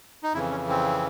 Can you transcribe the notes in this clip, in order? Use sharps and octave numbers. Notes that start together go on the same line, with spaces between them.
D#4
F2 C#3 E3 E4
C#4
C4